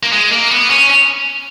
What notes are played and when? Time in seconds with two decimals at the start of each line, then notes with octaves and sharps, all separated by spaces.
0.03 A#3
0.13 G#3
0.32 A#3
0.50 B3
0.70 C#4